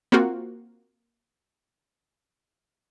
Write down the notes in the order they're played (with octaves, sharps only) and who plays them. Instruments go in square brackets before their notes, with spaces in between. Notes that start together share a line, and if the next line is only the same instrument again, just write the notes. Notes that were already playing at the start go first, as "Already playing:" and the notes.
[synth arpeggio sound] A#3 C4 F4 F#4